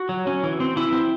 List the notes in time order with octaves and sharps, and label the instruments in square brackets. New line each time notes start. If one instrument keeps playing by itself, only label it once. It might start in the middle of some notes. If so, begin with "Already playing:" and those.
Already playing: [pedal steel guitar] F#4
F#3
C#4
E3
C4
E3 E4
C4